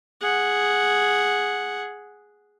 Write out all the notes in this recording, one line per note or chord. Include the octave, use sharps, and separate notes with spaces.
G#4 F#5